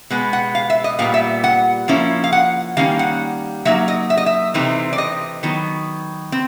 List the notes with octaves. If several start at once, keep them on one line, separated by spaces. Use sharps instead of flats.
B2 G#3 B3
F#5
F5
E5
D#5
A#2 G3 B3 F5
E5
F#5
F3 A#3 C#4 E4
F5
F#5
D#3 G3 A#3 C#4 F5
F#5
F#3 A#3 D#4 E5
D#5
E5
D#5
E5
C3 E3 A3 C4 D#4
D5
D#5
D#3 F#3 B3
C4